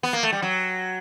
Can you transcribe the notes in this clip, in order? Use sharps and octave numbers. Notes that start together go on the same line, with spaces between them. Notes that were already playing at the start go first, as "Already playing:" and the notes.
B3
A#3
A3
G3
F#3